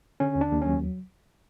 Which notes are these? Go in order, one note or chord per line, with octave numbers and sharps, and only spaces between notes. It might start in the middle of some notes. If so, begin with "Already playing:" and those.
D3 C#4
D#2
D4
D#2
F#3 C#4